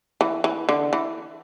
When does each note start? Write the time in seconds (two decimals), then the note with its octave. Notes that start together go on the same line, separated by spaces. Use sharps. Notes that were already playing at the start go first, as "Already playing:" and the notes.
0.21 E3
0.44 E3
0.69 D3
0.93 E3